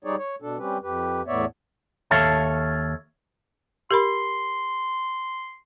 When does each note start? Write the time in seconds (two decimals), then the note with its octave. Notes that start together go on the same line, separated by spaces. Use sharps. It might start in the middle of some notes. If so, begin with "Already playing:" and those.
0.04 G3 D#4 G#4 C#5 D5
0.19 C#5
0.42 B2 D4 A4
0.58 G3 C4 C#4 G4 B4
0.83 F2 G4 B4
1.27 E2 A2 B3 C#5 D5 E5
2.11 D#2 A4 C#5 E5 F5 A5
3.91 G4 A#4 B5 C6